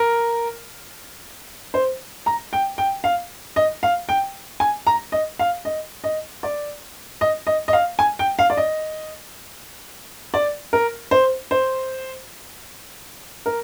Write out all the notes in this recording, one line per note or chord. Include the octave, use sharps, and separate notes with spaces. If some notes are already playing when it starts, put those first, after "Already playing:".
Already playing: A#4
C5
A#5
G5
G5
F5
D#5
F5
G5
G#5
A#5
D#5
F5
D#5
D#5
D5
D#5
D#5
D#5
F5
G#5
G5
F5
D5
D#5
D5
A#4
C5
C5
A#4